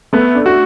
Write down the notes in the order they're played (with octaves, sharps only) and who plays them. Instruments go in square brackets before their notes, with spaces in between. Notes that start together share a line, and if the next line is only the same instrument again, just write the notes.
[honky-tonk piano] A3 [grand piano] B3
[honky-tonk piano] D4
[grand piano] F#4